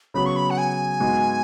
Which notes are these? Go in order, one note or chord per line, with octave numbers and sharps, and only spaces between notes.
C#3 F#3 B3 F#4 B5
C#6
B5
F#5
G#5
G#2 G#3 B3 F#4